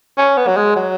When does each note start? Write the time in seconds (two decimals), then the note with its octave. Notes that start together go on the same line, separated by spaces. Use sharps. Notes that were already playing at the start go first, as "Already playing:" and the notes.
0.17 C#4
0.37 B3
0.47 F#3
0.57 G#3
0.76 F#3